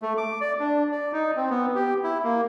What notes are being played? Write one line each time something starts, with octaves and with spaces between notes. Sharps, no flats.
A3
D6
D5
D4
D5
D#4
C4
B3
G4
E4
A#3